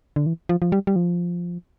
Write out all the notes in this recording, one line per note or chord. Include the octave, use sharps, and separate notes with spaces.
D3
E3
F3
F3
G3
G3
F3